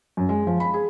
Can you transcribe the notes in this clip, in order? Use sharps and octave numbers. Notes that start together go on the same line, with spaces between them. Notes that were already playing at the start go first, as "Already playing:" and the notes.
F#2
G#3
F3
B5
G#4